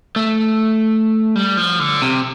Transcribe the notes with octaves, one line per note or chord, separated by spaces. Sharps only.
A3
G3
F3
D3
C3